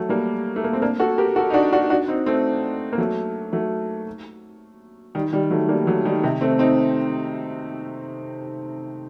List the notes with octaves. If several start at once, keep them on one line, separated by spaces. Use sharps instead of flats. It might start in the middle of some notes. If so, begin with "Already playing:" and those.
Already playing: F#3 A3
G3 A#3
A3
A#3
C4
A#3 D4
F#4 A4
G4 A#4
F#4 A4
D#4
D4 F#4
D4 F#4
D4 F#4
C4 D#4
A3 C4
A#3
F#3 A3
F#3 A3
D#3 G3
D#3 G3
F#3 A3
G3 A#3
F#3 A3
D#3 G3
C3 D#3
A3 C4
C4 D#4